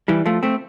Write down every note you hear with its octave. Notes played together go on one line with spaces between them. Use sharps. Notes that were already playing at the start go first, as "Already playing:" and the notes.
E3 G3
F3 A3
A3 C4